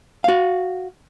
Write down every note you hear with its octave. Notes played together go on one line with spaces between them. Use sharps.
F#4 F5